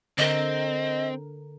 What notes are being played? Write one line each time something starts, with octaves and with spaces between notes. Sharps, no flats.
D3 C4 A#4 D#5